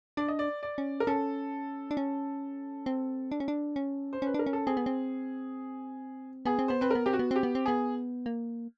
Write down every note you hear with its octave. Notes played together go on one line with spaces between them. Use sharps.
D4 D5
D#5
D5
D5
C#4
A#4
C#4 A4
D4
C#4
C4
D4
C#4
D4
C#4
C5
C#4 B4
D4 A#4
C#4
A4
C4 G#4
B3
C4
B3 G#4
C4
B3 C5
C4 B4
B3 A#4
C4 G4
F#4
B3
C4 G4
B3
C4
B3 G#4
A#3